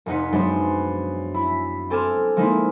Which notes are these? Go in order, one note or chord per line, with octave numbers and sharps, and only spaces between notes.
F1 F2 D#4 F#5 B6
F#2 F3 G#3 B3 C4 D4
E4 B5
C4 A4 G#5 D6 F6 E7
F3 G#3 A#3 D#4 E4